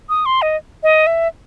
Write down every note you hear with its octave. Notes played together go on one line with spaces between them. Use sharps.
D#6
C6
D#5
D#5
E5